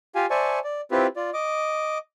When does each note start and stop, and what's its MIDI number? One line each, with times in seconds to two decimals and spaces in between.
0.15 0.26 65
0.15 0.26 67
0.15 0.26 77
0.15 0.26 80
0.30 0.59 72
0.30 0.59 74
0.30 0.59 76
0.30 0.59 80
0.30 0.59 81
0.30 0.59 85
0.64 0.81 74
0.91 1.07 60
0.91 1.07 64
0.91 1.07 65
0.91 1.07 67
0.91 1.07 71
1.16 1.30 65
1.16 1.30 74
1.33 1.98 75
1.33 1.98 86